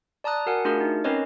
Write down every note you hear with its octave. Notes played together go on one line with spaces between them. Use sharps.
D5 A5 A#5 D#6 F#6
F#4 A#4 F#5 G#5
A3 D4 F4 F#4 G#4 A#4
D#4
C4 C#4 A#4 B4 C#5 D#5